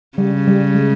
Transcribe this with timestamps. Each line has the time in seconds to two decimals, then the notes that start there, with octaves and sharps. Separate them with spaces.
0.18 C#3 G3
0.47 G3
0.75 G#3